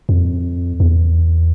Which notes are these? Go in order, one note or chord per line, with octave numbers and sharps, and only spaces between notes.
F2
E2